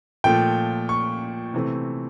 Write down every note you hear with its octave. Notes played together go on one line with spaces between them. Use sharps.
A#2 F3 A3 G5
C#6
C3 E3 A3 C4